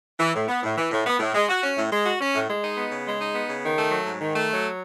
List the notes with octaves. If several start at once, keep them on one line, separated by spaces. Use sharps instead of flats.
E3
A2
B3
A2
E3
A2
B3
A2
G#3
F#4
C#4
A2
G#3
F#4
C#4
A2
G#3
D#4
B3
C#3
G#3
D#4
B3
C#3
D#3
A3
F#3
G#2
D#3
A3
F#3